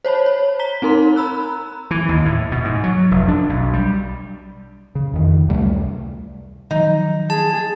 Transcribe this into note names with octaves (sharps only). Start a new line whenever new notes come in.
C5 C#5 A5 B5
C#5
A#5 B6 G7
C4 D#4 A#4 C6
A#5 B5 E6 F#6
E3
D#2
A2
B2
G#2
F#3
F1
D4
B1
G3
C#3
F2 D#3
C#2 C3 G3 A3
D#3 F3 F#3 D#4
G#4 A5